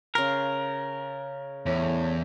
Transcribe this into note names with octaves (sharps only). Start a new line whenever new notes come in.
C#3 A#4 F5 C6
E2 A2